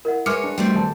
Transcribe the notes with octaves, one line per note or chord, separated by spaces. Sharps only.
E4 A#4 D#5 F#5
G#3 A#4 B4 C#5 E5 D6 F6 C#7
D4
G3 A3 C4 F#4 G5
D#1 A5